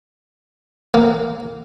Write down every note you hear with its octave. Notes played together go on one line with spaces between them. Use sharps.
A#3